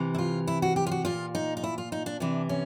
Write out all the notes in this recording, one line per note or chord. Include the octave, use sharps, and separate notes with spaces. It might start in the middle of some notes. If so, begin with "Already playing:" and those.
Already playing: C3 E3
E4
F4
E4
F#4
G4
F4
F#4
A#2 F4
D#4
D#4
E4
F4
D#4
D4
C3 E3 D4
C#4